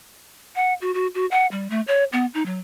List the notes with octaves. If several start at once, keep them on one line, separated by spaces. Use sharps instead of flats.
F#5
F#4
F#4
F#4
F#5
G3
A3
C#5
B3
D#4
F#3